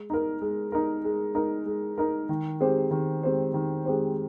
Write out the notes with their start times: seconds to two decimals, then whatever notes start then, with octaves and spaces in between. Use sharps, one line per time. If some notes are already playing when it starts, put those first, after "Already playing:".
Already playing: G#3
0.10 D#4 A#4
0.42 G#3
0.72 D#4 A#4
1.04 G#3
1.35 D#4 A#4
1.66 G#3
1.98 D#4 A#4
2.29 D#3
2.60 G#3 C4 G4 C5
2.91 D#3
3.23 G#3 C4 G4 C5
3.54 D#3
3.85 G#3 C4 G4 C5